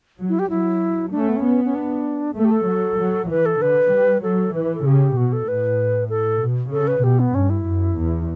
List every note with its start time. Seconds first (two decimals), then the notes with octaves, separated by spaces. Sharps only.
0.19 F#3
0.29 E4
0.39 G4
0.50 F#3 E4
1.12 A3 D4
1.20 C#4
1.29 B3
1.36 C#4
1.43 B3
1.65 C#4
1.75 D4
2.36 A3 A4
2.45 G4
2.51 A4
2.68 F#3
2.99 F#3
3.30 E3 B4
3.46 A4
3.61 D3 B4
3.92 G3
4.23 F#3 A4
4.54 E3 B4
4.65 B4
4.75 A4
4.86 C#3 G4
5.16 B2 F#4
5.33 A4
5.48 A2 B4
6.10 A4
6.41 B2
6.72 C#3 A4
6.88 B4
7.04 B2 G4
7.20 B3
7.35 G2 C#4
7.50 E4
7.66 F#2
7.96 E2